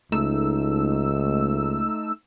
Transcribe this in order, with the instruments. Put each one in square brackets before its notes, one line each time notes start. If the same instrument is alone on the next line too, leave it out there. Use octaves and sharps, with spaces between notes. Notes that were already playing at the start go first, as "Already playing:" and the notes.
[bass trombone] C#2 [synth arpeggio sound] A3 D#4 E6